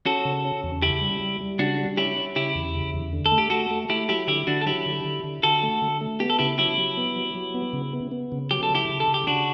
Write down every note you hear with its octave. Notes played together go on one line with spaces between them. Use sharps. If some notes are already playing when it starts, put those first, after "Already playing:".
C#4 F#4 A4
C#3
C#4
E2
C#3 E4 G4
G3
G3
G3
C#3 D4 F#4
G3
C#4 E4 G4
C#4
C#3 E4 G4
E2
C#3
E2
D3
A4
A3
G4
A3 F#4 A4
A3
A3 E4 G4
F#3 E4 G4
D3 E4 G4
D3 D4 F#4
A4
F#3 E4 G4
D3
D3
D3
D3 F#4 A4
A3
D3
A3
B3 G4
A4
C#3 E4 G4
F#3 E4 G4
F#3
B3
F#3
F#3
B3
C#3
B3
B3
C#3
F#3 G4
A4
C#3 E4 G4
C#3
A4
C#3
G4
C#3 D4 F#4